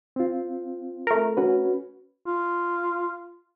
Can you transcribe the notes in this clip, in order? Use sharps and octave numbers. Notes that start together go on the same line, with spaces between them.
C4 F4
A3 A#4
C#4 F#4 B4
F4